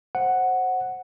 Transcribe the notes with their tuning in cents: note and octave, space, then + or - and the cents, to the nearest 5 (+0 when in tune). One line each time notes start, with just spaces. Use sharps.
C5 +15 F#5 +0